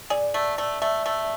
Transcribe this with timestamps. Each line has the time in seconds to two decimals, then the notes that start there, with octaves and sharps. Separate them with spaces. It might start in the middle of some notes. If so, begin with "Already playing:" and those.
0.10 G#4 D5
0.34 A3
0.58 A3
0.82 A3 E5
1.06 A3